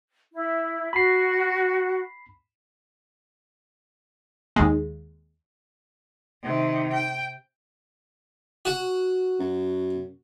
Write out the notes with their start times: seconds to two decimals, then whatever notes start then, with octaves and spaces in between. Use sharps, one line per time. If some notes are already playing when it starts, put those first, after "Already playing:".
0.33 E4
0.93 F#4 B5 C7
4.56 D#2 G#3
6.43 C3 D#3
6.92 G5
8.65 F#4
9.40 F#2